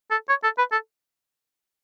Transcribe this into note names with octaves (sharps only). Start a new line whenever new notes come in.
A4
C#5
A4
B4
A4